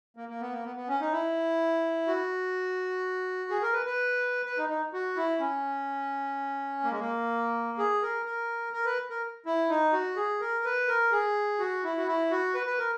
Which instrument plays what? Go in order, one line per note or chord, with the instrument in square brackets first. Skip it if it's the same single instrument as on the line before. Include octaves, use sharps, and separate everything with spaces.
[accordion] A#3
A#3
B3
A#3
B3
B3
C#4
D#4
E4
F#4
G#4
A#4
B4
B4
B4
D#4
D#4
F#4
E4
C#4
A#3
G#3
A#3
G#4
A#4
A#4
A#4
B4
A#4
E4
D#4
F#4
G#4
A#4
B4
A#4
G#4
F#4
E4
F#4
E4
F#4
B4
B4
A#4